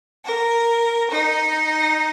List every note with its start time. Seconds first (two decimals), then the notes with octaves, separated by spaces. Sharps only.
0.25 A#4
1.11 D#4